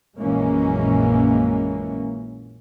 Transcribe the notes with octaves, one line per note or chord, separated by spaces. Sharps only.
A#1 F#2 E3 G#3 A#3 C#4